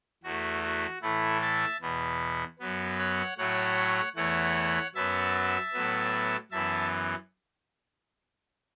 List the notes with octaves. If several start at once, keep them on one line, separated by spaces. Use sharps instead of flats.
E2 E3 A3 F#4
F#4
A2 E3 A3 E4 A4
E5 A5
E2 B2 B3
F#2 F#3 B3
C#5 F#5
A2 F#3 A3 C#5 F#5
E2 E3 A3 C#5 F#5
F#2 F#3 B3 E5 A5
A2 F#3 B3
F#2 E3 B3 E5 A5